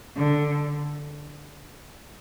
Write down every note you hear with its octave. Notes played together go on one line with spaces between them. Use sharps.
D3